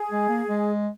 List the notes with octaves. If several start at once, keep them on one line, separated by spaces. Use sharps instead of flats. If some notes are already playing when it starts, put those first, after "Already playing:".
Already playing: G#4
G#3
A#3
G#3